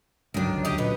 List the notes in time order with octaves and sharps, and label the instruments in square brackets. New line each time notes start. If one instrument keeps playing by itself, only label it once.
[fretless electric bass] C#2 D3 F#3 [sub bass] G2 [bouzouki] D#3 D4
[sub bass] A#1
[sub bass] D#2 [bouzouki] G4 D#5
[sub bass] A#2 [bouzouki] B3